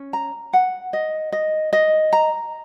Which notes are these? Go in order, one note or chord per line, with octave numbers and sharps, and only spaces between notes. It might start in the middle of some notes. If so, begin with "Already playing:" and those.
Already playing: C#4
A#5
F#5
D#5
D#5
D#5
A#5